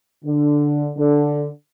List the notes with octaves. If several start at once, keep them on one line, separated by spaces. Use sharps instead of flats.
D3
D3